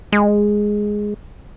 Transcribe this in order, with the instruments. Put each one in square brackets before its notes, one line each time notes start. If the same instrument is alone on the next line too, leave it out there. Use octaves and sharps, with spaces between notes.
[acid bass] G#3